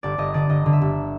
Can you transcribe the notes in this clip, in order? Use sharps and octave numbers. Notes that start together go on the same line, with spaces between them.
G1 D5
G1 D#5
D3 D5
G1 D#5
D3
E5
G1